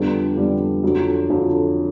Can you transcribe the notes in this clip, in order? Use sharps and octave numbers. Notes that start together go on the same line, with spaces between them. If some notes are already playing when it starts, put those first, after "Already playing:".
Already playing: F2 D3 G3 B3
F2 D3 G3 B3
F2 D3 F#3
F2 D3 F#3